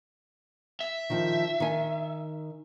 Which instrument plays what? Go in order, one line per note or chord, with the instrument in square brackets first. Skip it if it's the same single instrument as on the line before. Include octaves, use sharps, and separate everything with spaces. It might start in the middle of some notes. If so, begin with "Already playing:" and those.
[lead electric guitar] E5
[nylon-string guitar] D#3 F3
D#3 G#5